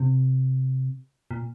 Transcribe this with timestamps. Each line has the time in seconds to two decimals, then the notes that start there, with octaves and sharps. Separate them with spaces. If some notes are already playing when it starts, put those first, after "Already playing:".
Already playing: C3
1.31 A#2